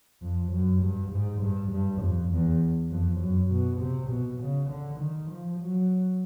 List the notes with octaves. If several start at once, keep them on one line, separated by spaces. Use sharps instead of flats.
F2
F#2
G2
G#2
G2
G2
F2
E2
F2
F#2
B2
C3
B2
C#3
D3
D#3
F3
F#3